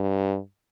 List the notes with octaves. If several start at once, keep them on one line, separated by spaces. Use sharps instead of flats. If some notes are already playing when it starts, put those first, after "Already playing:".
Already playing: G2